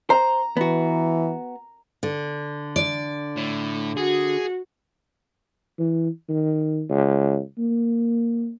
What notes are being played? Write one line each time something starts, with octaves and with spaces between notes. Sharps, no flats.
C5 A#5
E3 B3 F#4
D3
D5
A2
F#4 G#4
E3
D#3
C#2
A#3